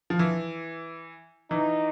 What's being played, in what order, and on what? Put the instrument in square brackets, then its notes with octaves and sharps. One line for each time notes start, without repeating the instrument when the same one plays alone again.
[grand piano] F3
E3
[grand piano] E3 [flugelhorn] D#4